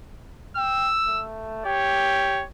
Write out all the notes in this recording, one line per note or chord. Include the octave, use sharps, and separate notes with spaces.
G5 E6
A3
G4 C#5